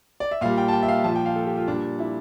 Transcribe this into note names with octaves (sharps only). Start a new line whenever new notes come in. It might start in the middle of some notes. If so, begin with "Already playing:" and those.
D5
E5
A#2 G3 F5
G5
A5
G5
E5
F5
A#2 F3 A5
G5
F5
A4
G4
F4
A#2 G3 D4
E4